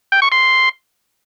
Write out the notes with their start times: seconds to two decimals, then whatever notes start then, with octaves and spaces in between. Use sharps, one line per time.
0.12 G5
0.22 C#6
0.32 C6